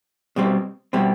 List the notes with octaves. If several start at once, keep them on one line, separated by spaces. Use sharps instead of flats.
B2 G3 C4
B2 G3 C4